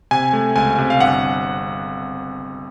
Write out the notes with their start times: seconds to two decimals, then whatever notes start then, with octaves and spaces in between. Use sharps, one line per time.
0.11 C3 G#5
0.33 A3
0.56 C#2 G#5
0.78 C3
0.90 F5
1.00 G1 F#5